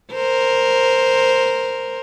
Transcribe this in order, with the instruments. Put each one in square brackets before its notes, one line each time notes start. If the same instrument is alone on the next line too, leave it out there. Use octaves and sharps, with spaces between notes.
[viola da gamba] A#4 C5